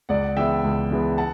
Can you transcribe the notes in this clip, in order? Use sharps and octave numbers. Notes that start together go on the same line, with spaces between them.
C#2 D5 F#5
C#3 E3 B3 E5 G5
C#2
C#3 E3 B3
F#5 A5